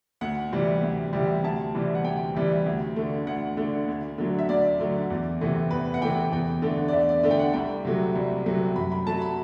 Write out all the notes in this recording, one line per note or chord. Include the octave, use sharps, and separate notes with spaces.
D2 F#5
C3 E3 G3
D2
C3 E3 G3
D2 A5
C3 E3 G3
F#5
D2 G5
C3 E3 G3
D2
D3 A3
D2 F#5
D3 A3
D2
D3 F#3 A3
E5
D2 D5
D3 F#3 A3
E2
C3 E3 A3
E2 B4
F#5
C3 E3 A3 G5
E2 G5
D3 A3
D5
E2 E5
D5
D3 A3
G5
F#5
C2 G5
C3 F#3 A3
C2
C3 F#3 A3
F#2 B5
B5
F#3 A3 A5
B5